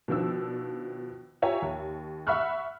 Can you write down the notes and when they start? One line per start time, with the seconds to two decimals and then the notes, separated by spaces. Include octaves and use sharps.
0.08 B2 D#3 F3 D4 E6
1.42 F4 G4 C#5 E5 G#5 A#5
1.62 D#2
2.27 E5 F#5 B5 C#6 F6 F#6